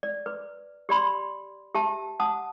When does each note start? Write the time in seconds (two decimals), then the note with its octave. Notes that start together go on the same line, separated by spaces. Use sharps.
0.03 D5
0.26 B4
0.89 G4 D5 B5 C6
1.75 G4 E5 A5
2.20 F#5 A5 D#6